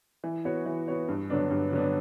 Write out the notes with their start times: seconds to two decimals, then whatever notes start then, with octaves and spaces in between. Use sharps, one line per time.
0.24 E3
0.45 B3 F#4 C#5
0.66 E3
0.88 B3 F#4 C#5
1.09 G2
1.30 D3 F#3 B3 D4
1.51 G2
1.72 D3 F#3 B3 D4